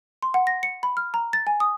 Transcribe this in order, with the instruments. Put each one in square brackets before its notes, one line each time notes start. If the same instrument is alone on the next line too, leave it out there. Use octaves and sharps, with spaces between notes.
[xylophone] C6
F#5
A#6
C#7
B5
F6
A#5
A6
G#5
D#6